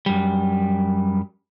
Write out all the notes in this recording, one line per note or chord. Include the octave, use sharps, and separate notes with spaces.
F#2 G3